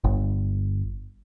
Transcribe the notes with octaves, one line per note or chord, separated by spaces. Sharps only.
G1